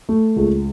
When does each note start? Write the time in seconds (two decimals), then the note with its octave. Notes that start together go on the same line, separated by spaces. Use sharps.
0.09 A3
0.36 C#2